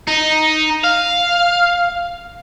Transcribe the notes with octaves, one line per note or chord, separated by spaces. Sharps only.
D#4
F5